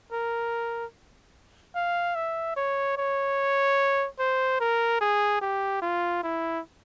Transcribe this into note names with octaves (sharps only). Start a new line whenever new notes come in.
A#4
F5
E5
C#5
C#5
C5
A#4
G#4
G4
F4
E4